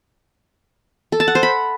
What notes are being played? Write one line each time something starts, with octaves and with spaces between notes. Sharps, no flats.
A4
A5
F#5
C5
B5